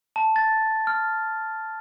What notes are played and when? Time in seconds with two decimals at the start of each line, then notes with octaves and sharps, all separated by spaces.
0.16 A5
0.36 A6
0.87 F6